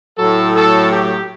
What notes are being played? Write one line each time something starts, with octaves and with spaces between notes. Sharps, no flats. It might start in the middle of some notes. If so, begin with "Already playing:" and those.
A2 F#3 A4
A4
G4